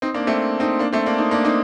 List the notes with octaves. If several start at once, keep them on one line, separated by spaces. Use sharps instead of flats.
C4 D#4
A#3 D4
A3 C4
C4 D#4
A#3 D4
A3 C4
A#3 D4
C4 D#4
A#3 D4
C4 D#4